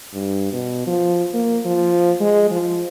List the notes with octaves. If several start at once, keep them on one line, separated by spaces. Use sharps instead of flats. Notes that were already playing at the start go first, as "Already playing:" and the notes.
G2
B2
F3
A#3
F3
G#3
F3